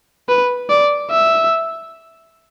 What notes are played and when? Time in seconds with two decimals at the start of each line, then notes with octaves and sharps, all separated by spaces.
0.29 B4
0.70 D5
1.10 E5